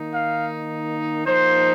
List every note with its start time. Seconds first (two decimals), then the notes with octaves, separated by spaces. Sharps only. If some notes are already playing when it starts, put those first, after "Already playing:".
Already playing: D#3 A#3 D#4
0.12 F5
1.26 F3 A#3 D#4 C5